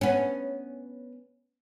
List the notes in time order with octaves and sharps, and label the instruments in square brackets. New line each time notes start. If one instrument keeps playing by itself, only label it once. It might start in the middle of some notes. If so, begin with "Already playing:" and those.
[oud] B3 C#4